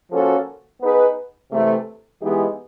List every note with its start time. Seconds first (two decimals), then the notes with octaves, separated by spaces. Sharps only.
0.11 F3 A#3 C#4 F#4 A4
0.81 B3 D#4 G#4 B4
1.52 C3 E3 A3
2.22 E3 G#3 B3 D#4 G4